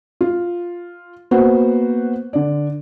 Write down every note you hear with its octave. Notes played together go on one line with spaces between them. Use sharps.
F4
A#3 B3 F#4 C5
D3 D5